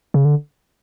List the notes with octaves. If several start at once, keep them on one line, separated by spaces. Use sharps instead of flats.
C#3
D3